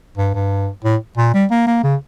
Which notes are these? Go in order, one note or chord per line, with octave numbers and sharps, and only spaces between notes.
G2
G2
A2
A#2
G3
A#3
A#3
C#3